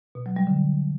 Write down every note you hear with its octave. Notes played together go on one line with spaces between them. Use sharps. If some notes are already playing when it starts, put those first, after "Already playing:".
B2
F#3
G3
D3